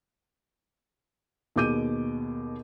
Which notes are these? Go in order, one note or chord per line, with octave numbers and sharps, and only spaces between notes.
D#2 B2 G#4 D6 G6 D#7